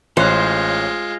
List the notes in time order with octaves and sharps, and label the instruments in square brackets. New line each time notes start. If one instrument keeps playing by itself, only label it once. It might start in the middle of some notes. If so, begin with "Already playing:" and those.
[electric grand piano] A1 C#5 F#6 [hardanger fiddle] G#3 F4 [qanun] C5